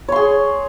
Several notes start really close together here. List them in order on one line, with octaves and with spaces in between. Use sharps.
C#5 C6 G#4